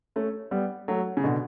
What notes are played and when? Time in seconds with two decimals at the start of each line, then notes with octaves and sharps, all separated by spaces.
0.16 A3 C#4
0.51 G3 B3
0.88 F#3 A3
1.17 C#3
1.24 B2 D3